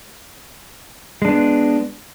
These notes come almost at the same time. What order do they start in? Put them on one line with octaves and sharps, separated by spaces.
G#3 D4 B3